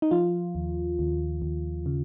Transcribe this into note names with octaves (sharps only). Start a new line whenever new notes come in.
D#4
F3 F4
D#2
D#2
D#2
C#3